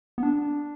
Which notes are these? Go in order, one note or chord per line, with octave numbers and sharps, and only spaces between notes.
B3
D4